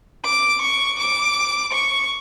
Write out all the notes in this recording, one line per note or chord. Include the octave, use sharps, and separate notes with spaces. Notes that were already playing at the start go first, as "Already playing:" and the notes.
D6
C#6
D6
C#6